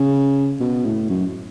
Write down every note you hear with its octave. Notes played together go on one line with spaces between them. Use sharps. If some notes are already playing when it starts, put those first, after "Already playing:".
Already playing: C#3
B2
A2
F#2